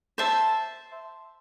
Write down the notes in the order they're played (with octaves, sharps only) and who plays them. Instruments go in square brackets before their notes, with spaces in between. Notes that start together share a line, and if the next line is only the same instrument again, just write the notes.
[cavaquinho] C5 E5 A5